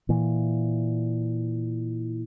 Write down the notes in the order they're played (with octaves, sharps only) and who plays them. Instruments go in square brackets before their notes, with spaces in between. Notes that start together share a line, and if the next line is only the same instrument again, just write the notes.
[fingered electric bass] A#2 E3